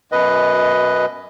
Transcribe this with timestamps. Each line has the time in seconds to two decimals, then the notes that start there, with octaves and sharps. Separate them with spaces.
0.12 F#2 B2 B4 D#5